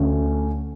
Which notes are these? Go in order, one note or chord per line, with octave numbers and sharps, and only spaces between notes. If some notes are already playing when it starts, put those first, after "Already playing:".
Already playing: D2 D3 A3 C#4